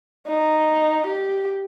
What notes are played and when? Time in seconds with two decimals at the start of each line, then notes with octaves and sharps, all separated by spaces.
0.29 D#4
1.07 G4